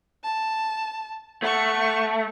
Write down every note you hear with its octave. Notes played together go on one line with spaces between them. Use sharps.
A5
A3 F#5 C#6